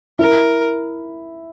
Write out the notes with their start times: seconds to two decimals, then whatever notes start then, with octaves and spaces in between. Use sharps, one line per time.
0.19 E4 A#4